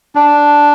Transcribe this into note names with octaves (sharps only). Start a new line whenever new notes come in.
D4